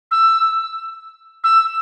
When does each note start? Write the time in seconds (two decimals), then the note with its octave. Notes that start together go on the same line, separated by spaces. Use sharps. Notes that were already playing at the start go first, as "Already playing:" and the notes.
0.11 E6
1.44 E6